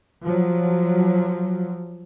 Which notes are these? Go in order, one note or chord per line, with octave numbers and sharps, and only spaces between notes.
F3 F#3